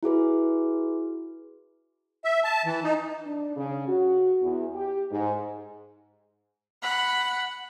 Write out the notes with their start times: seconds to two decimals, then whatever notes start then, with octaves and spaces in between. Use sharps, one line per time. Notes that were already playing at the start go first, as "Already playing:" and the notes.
0.03 E4 F#4 G#4 B4
2.24 E5
2.44 A5
2.65 E3
2.84 D#4
3.26 D4
3.56 C#3
3.88 F#4
4.41 E2
4.74 G4
5.11 G#2
6.82 F#5 B5